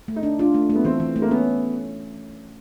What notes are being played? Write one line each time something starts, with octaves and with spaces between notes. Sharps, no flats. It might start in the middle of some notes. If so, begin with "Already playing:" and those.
A3
D#4
D4
D4 F4
A3
A3
B3
E3 C4
E3
A3
A#3
B3 C#4